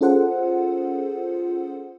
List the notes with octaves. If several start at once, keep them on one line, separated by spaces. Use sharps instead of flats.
C#4 F4 G#4 A4 C5 F#5